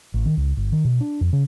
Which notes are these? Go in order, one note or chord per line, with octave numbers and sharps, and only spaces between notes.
A1
D#3
C#2
G1
D#3
B2
D4
F2
C#3